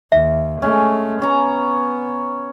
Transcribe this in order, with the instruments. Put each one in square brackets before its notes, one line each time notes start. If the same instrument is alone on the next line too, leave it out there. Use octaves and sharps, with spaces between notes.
[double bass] D#2 [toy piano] E5
[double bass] G#3 A3 [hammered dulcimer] C#4
[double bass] B3 [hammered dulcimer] C#4 A#5